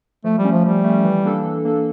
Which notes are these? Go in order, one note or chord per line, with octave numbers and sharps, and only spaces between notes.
F3 A3
G3
A3 C#4
F3
F3 G3
A3 C#4
E3
A#3 D4 A4
E3
A#3 D4 A4